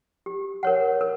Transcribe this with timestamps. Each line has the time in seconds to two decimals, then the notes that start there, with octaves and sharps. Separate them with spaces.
0.26 G4
0.63 A#4 C#5 F#5
1.01 A#4